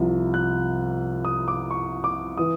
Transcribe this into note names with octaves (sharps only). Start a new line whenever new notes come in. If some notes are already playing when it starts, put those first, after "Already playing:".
Already playing: C2 C3 F3
F#6
D#6
D6
C#6
D6
E3 D#6